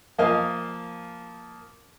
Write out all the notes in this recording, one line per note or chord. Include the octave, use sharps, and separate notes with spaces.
F3 A#3 D#5 F5 G#5 F6